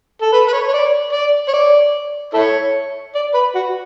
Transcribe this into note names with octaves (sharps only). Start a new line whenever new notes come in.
A4
B4
B4
C#5
C#5
D5
D5
C#5
D5
E4 A4 C#5
D5
B4
F#4